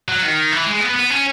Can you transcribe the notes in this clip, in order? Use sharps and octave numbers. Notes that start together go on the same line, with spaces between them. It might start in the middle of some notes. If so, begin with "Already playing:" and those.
F#3
D#3
E3
G#3
B3
B3
C#4